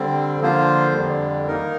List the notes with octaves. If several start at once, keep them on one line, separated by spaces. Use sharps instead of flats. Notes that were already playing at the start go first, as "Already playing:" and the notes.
Already playing: D3 G3 C4
D3 F3 A#3 F4 C5
F2 D3 G3
D#3 A#3 D#4 A#4